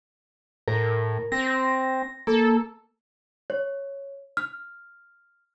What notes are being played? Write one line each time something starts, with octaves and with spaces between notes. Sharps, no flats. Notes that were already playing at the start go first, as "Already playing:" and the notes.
A2 A#4
C4 A#6
A#3 A4
C#5
F6